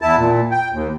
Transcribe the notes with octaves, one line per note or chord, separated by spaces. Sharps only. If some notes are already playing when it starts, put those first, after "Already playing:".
E2 E4 A5
A#2
G5
D#2